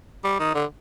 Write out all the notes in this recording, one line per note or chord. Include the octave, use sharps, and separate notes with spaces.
G3
D#3
D3